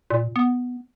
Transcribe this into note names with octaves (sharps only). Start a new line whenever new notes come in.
A#2
B3